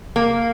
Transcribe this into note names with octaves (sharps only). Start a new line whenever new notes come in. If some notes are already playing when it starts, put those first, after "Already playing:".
A#3